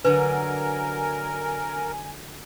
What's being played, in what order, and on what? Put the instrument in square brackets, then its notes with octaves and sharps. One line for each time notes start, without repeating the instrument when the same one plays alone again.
[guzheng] D3 F#3 [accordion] A#4 [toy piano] B4 [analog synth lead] G#5